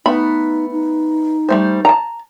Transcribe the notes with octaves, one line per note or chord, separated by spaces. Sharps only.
A3 B3 D#4 B5
D#4
G3 A3 C5
A5 A#5